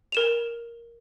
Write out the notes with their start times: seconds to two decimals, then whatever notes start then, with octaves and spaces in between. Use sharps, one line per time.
0.12 A#4 E7 F7